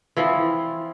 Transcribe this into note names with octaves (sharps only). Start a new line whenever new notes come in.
E3 F3 C4 F4